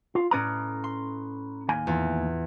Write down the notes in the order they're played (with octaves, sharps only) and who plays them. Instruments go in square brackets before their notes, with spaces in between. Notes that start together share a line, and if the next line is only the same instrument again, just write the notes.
[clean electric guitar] F4
[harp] A2 D5 D#6 [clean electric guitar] C#4 B4 A#5
[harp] C6
[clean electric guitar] D#2 A#3 G#5
[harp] E2 F4